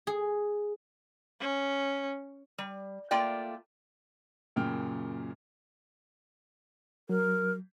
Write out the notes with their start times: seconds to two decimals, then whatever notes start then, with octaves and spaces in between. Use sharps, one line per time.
0.07 G#4
1.40 C#4
2.58 G3
3.11 A3 A#3 F4 D5 G5
4.56 F#2 A#2 C#3 G5 F6
7.09 F#3 A#4